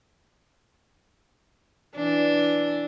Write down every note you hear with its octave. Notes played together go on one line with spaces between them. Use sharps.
E3 D4